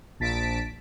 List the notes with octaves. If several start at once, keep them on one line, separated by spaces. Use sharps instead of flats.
A#1 A5 B6 D7